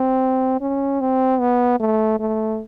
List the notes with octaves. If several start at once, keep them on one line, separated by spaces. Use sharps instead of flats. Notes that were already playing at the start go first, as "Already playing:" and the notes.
Already playing: C4
C#4
C4
B3
A3
A3